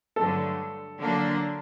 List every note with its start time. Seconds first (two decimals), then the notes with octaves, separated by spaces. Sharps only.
0.16 G2 D3 F#3 A3 A4
1.01 D3 F#3 A#3 D4